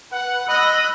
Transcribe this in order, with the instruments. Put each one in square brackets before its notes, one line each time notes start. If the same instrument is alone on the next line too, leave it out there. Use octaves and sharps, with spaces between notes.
[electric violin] B4 [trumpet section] F#5
[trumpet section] D#5 [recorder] B5 [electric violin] E6 F#6